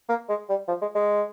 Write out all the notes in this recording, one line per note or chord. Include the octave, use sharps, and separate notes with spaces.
A#3
G#3
G3
F3
G#3
G#3